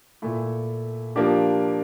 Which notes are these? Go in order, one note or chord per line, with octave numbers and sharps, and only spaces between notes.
A#2 A3 E4
F3 A#3 D4 G4